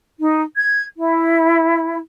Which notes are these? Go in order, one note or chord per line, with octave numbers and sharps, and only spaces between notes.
D#4
G#6
E4